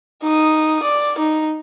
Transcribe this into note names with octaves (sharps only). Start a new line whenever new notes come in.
D#4 D#6
D5
D#4